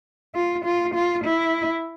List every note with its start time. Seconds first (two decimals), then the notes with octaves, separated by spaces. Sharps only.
0.35 F4
0.65 F4
0.95 F4
1.25 E4